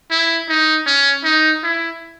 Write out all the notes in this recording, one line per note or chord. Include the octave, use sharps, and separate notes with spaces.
E4
D#4
C#4
D#4
E4